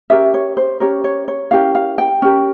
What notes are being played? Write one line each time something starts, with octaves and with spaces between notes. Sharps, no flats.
C#4 G4 A#4 E5
C#5
C5
C#4 G4 A#4 C#5
C#5
C#5
C#4 E4 G4 A#4 F5
F5
G5
C#4 G4 A#4